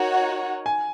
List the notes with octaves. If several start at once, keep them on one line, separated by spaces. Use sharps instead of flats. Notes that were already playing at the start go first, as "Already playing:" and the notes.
Already playing: D#4 F#4 A#4 C#5 F#5
G#5